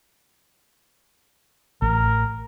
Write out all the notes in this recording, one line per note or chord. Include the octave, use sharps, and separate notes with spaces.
A1 A#4